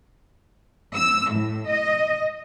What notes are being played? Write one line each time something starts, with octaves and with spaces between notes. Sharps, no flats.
E6
A2
D#5